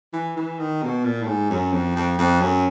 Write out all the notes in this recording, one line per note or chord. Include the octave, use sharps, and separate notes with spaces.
E3
E3
D#3
B2
A#2
A2
G#2
F#2
F2
F2
F2
F#2